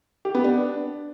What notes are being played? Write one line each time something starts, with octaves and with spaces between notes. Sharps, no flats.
G4
B3
D4